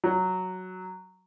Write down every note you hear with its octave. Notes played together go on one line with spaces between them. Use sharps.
F#3